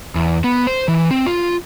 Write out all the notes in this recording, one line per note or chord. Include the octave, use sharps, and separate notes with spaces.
E2
B3
C5
E3
C4
F4